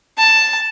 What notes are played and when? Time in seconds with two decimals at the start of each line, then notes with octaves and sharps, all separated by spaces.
0.18 A5